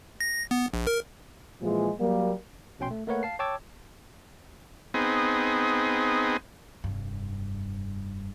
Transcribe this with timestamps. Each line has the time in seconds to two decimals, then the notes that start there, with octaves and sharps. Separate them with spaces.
0.20 A#6
0.51 B3
0.74 A#1
0.87 A#4
1.62 A#2 E3 F3 G#3
2.00 F#3 G3 A#3
2.79 A#1 B2 C#4 G5 C6
2.91 A3
3.07 A3 A#3 A#4 B4 C#5 F#5
3.23 F5 A5 C7
3.39 C#5 G5 A5 D6 E6 G#6
4.94 B3 C4 D#4 G#4
6.84 F1 G2